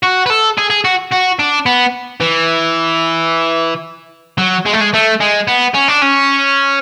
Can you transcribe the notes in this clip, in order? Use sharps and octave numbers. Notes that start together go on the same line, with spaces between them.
F#4
B4
A4
G#4
G#4
F#4
F#4
D4
B3
E3
F#3
G#3
A3
G#3
A3
G#3
B3
C#4
D4
C#4